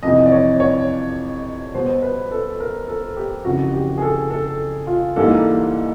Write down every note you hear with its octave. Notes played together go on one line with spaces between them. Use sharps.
F2 C3 E3 D#5
D5
C#5
C#5
B2 G3 B3 C5
B4
A4
A#4
A4
G4
F2 C#3 E3 F#4
G4
G#4
A4
A4
F4
G#2 E3 G3 A#3 A4